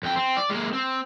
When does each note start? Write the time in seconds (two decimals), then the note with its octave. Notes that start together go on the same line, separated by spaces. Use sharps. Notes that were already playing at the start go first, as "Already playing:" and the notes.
0.03 F2 G5
0.16 C4
0.37 D5
0.50 G#3 A#3
0.73 C4